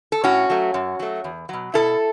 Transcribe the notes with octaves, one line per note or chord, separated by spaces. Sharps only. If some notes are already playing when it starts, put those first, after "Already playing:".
A4
A2 C#4 F#4
F#3 A3
F#2
F#3 A3
E2
B2 F#3
B2 E4 A4